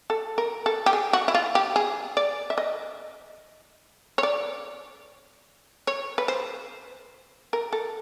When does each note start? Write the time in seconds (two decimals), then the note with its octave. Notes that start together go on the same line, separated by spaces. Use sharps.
0.10 A4
0.38 A#4
0.66 A4
0.86 G4
0.93 G#4
1.13 F#4
1.28 E4
1.35 F4
1.55 G4
1.76 G#4
2.17 D5
2.50 E5
2.58 D#5
4.18 C#5
4.23 D5
5.87 C#5
6.18 B4
6.28 C5
7.53 A#4
7.73 A4